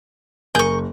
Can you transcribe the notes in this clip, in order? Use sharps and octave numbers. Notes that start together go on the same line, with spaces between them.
F#1 G#4 A#4 C#6 G6